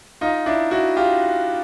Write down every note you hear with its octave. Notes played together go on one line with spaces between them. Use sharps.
D#4 F4
D4 E4
E4 F#4
F4 G4